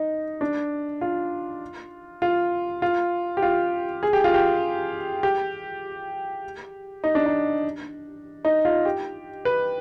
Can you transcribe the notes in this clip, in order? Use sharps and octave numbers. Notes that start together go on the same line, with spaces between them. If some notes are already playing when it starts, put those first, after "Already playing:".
Already playing: D#4
D4
F4
F4
F4
G4
F4
G#4
G4
F4
G4
G4
D#4
D4
D#4
D#4
F4
G4
B4